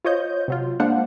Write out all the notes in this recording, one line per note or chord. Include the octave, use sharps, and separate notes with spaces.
F4 C5 C#5 D#5 G6
C3 F#3 F4
G#3 A#3 D4 C5 F5 F#5